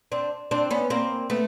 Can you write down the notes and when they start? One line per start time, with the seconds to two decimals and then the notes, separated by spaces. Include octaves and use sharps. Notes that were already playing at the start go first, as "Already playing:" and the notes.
0.12 C4 D4
0.51 C4 D4
0.71 B3 C#4
0.90 A#3 C4
1.30 A3 B3